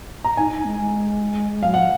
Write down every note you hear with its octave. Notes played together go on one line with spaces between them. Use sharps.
A#5
D#4 G#5
D#4
G#3
G#3
F#3 F5
F3 F#5